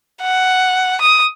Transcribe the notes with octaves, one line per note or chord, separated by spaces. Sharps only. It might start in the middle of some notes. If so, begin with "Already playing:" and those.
F#5
D#6